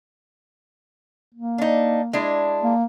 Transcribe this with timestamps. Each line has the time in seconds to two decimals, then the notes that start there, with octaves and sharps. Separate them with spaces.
1.35 A#3
1.58 D4 D#4
2.13 G#3 D4 E4
2.63 A#3